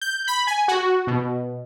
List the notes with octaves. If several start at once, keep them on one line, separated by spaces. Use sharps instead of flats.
G6
B5
G#5
F#4
B2